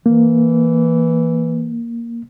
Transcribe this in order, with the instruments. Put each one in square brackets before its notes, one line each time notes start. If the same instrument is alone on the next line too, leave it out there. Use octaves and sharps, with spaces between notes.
[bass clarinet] E3 [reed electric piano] A#3